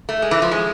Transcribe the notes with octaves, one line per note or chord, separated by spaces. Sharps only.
A3
G#3
E3
F3
G#3